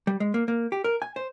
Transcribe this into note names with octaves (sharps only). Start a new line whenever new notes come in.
G3
G#3
A#3
A#3
G4
A#4
G#5
C5